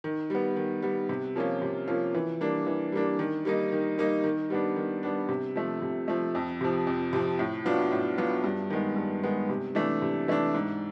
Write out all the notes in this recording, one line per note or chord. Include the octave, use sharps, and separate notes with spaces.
D#3
G3 B3
D#3
G3 B3
C3
F3 A#3 C#4 F4
C3
F3 A#3 C#4 F4
E3
G3 A#3 D4
E3
G3 A#3 D4
D#3
G3 A#3 D#4
D#3
G3 A#3 D#4
D#3
G3 B3 D4
D#3
G3 B3 D4
C3
F3 A3
C3
F3 A3
F2
C3 F3
F2
C3 F3
A2
F#3 B3 D4 F4
A2
F#3 B3 D4 F4
G2
D#3 G#3 B3
G2
D#3 G#3 B3
C3
E3 A3 D4
C3
E3 A3 D4
G#2